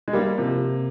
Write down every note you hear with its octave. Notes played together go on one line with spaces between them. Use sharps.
G#3
G3 A#3
C3 F3